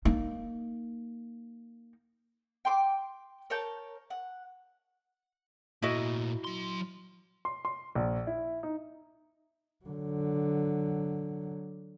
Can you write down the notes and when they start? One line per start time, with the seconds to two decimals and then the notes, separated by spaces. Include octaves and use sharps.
0.05 A#3 D#4
2.65 G5 C6 D6
3.50 A#4 C#5 A5 G6
4.10 F#5
5.82 A#2 A3 E4 F#4 D#5
6.44 F#3 C6
7.45 C6
7.65 C6
7.95 A#1
8.27 E4
8.63 D#4
9.85 D3 F#3